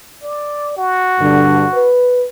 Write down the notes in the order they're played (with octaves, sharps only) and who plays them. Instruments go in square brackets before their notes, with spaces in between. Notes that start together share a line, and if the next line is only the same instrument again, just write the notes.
[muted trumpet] D5
F#4
[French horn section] G2 D3
B4